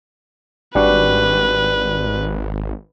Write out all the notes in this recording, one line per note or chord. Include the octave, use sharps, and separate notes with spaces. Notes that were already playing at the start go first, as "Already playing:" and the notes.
G#1 G3 D4 F#4 B4